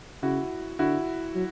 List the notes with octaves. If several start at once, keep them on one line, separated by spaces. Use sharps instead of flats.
C#3 E4 F#4
D3 E4 F#4
F#3